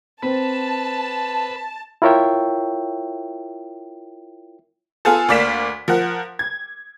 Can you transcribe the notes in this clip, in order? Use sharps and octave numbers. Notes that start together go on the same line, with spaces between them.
C4 B4 A5
E4 F4 A#4 C#5 E5 G5
B3 F4 G#4 A4
D2 A#3 D5 F5 B6 E7
F3 A#4 F#5
G#6